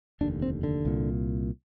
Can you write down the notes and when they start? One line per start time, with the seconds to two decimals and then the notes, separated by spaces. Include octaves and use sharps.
0.21 F1 D#2 D3 D4
0.42 C4
0.63 D3
0.85 C2 A#2